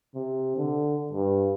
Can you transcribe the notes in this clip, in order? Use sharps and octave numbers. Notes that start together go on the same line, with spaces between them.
C3
D3
G2